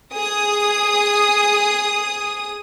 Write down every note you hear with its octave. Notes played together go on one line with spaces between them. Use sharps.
G#4 D#6